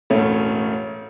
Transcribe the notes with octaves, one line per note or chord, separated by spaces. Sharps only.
E1 A2 A3 C#4